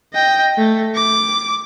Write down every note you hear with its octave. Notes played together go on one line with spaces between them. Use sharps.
D#5 G5
A3
D6